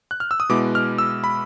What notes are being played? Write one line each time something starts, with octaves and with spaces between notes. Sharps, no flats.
F#6
F6
E6
D#6
B2 G#3 B3 E4 D6
F6
E6
B5